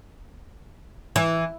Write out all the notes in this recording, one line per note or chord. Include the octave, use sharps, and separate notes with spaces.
E3